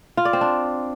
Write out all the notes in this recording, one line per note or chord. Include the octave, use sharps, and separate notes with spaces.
F4
D5
C4
D4